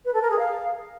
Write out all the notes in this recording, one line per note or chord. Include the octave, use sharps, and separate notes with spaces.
B4
A4
A#4
G#4
F5